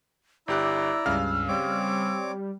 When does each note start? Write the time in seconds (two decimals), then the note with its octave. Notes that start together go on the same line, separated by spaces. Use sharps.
0.48 G1 E4 G4 D5 A#5 E6 F#6
1.06 C#2 G2 C#3 F5 F6
1.48 G3 C4 C#5 D6